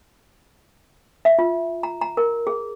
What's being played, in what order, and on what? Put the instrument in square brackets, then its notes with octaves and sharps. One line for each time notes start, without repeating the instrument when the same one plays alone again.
[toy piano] E5
F4
A#5
A#5
A#4
G#4